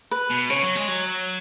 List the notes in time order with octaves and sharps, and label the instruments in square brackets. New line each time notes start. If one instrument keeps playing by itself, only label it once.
[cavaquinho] B4
[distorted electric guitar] B2
[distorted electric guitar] C#3 [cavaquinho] C#5
[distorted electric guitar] F#3
G#3
F#3